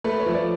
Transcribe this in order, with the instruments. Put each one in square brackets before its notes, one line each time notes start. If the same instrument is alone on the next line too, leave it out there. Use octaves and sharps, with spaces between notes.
[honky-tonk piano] A3 [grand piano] B4
[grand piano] C#5
[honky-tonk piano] F3
[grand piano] D5